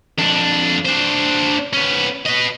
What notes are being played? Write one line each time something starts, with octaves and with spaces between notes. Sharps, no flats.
F2 D4
D4 C5
B3 C#4
B4 D#5